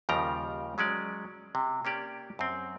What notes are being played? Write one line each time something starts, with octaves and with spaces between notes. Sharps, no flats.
D#2 C#3 F3 G3 G5 A#5
F#3 G#3 C#4 D5
C3
A#3 C#4 G4 D5
F#2 C4